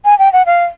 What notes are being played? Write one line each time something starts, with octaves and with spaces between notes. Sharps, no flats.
G#5
G5
F#5
F5